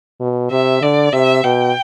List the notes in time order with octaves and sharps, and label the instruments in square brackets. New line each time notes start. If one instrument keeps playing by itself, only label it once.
[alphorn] B2
[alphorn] C3 [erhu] E5
[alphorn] D3 [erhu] D5
[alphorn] C3 [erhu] E5
[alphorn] B2 [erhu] G5